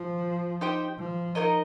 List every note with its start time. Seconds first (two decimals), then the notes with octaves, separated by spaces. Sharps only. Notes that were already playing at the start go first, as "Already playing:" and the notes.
Already playing: F3
0.61 D#4 G4 C5 G5
0.99 F3
1.35 D#4 G4 A#4 D#5